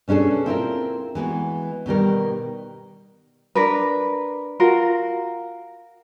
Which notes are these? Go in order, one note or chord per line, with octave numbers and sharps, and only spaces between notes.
B2 C#4 D4 G#4 A4
C4 E4 F4 A#4
E3 G#3 B3 F#4
B2 D#3 G3 A#4
D4 A#4 B4
F4 F#4 A#4